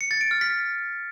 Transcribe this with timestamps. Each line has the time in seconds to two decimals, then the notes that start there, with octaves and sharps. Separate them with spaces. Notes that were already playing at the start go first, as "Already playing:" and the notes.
0.01 C#7
0.11 A6
0.21 D7
0.31 F6
0.41 B6